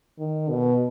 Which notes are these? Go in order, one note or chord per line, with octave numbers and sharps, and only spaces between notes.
D#3
B2